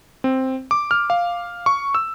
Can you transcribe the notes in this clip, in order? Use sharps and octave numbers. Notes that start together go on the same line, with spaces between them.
C4
D6
F6
F5
C#6
E6